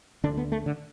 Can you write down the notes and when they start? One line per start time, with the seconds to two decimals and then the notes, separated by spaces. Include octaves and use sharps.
0.24 D2 D3 D4
0.37 B3
0.52 A3
0.66 D3